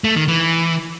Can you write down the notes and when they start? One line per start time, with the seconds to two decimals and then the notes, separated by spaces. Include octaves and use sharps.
0.04 A3
0.16 D#3
0.28 E3